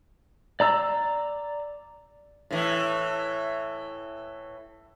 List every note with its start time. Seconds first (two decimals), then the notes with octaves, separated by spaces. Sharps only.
0.60 D5 A#5 E6
2.51 A2 E3